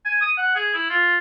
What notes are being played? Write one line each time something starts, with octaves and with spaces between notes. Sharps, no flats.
G#5
D#6
F#5
G#4
E4
F4